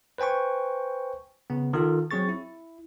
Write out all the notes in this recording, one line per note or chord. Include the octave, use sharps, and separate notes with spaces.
B4 C5 G5 G#5 C#6
C#3 B3
D#3 F4 A4
F#3 C4 G#4 C#6 A6
E4